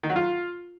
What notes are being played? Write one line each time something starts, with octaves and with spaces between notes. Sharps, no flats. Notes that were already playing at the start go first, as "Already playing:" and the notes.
D#3
F#3
F4